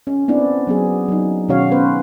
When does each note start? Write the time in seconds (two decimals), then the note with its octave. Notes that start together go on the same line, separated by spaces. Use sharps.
0.07 C#4
0.28 B3 C4 D4 E4
0.67 F#3 B3 G#4
1.08 F#3 D#4
1.48 B2 D#3 C#4 F#4 C#5 F5
1.71 B3 C#4 B4 C5